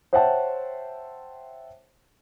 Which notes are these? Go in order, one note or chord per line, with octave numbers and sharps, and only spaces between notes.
C5 C#5 E5 F#5 G5 A5